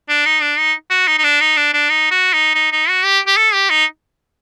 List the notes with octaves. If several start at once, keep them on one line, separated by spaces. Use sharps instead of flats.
D4
D#4
D4
D#4
F#4
D#4
D#4
D4
D#4
D4
D4
D#4
F#4
D#4
D#4
D#4
F#4
G4
G4
A4
G4
D#4